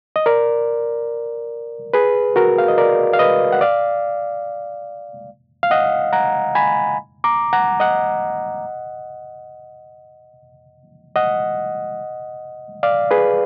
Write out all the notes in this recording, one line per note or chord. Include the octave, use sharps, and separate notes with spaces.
D#5
A#4 D5
G#4 B4
F#4 A#4
F5
D#5
A#4 D5
F5
B4 D#5
F#5
D5 F5
F5
D#5 F#5
F#5 A#5
G#5 B5
A#5 D6
F#5 A#5
D#5 F#5
D#5 F#5
D5 F5
G#4 B4